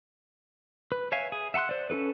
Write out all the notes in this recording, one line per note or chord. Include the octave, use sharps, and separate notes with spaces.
B4
C#5 E5 F5 G#5
G#4
E5 F#5 A5 C6 F#6
C5 D5
C#4 F4 A4 B4